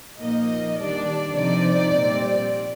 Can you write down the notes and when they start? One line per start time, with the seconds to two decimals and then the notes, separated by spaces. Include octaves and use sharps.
0.19 A#2 F3 A#3 D#4 D#5
0.77 D#3 G3 D4 D5
1.36 C3 F3 C4 D#4 D5
1.94 A#2 G3 C4